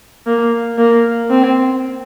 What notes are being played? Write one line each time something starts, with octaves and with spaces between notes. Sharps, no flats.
A#3
A#3
C4